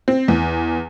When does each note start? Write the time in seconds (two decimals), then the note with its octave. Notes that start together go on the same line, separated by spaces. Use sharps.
0.08 C4
0.28 E2